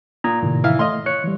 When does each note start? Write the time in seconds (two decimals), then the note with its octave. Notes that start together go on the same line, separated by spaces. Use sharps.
0.24 A#2 A#5 D#6 G#6
0.43 A2 C3 D#3
0.64 E3 E5 F5
0.79 A3 D#5 F5 C6
1.06 C#5 F#6 C#7
1.24 E3 G3